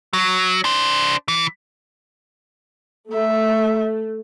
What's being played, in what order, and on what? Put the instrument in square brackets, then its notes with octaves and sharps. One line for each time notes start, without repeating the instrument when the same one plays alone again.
[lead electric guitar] F#3
D4 C5
E3
[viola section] A3 [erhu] E5